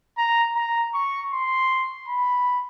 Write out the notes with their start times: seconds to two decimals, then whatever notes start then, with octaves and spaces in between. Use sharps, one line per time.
0.18 A#5
0.56 A#5
0.94 C#6
1.32 C6
2.08 B5